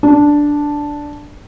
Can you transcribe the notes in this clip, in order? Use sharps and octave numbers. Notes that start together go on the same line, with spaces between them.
D4